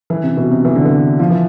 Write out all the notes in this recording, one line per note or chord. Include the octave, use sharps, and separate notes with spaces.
E3
C3
B2
C3
E3
D3
E3
F3
E3